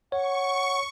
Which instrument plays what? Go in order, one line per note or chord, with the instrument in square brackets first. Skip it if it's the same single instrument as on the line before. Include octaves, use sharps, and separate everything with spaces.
[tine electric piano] C#5 [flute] F#5 [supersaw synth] C#6